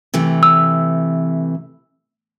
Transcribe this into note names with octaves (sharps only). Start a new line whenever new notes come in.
C3 E3 A3
E6